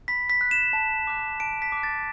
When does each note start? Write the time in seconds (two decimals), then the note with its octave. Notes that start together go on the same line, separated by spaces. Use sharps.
0.08 B5 B6
0.30 B6
0.41 F#6
0.51 E7
0.73 A5
1.07 D6 F#6
1.40 A5 D7
1.62 B6
1.72 D6 F#6
1.83 A6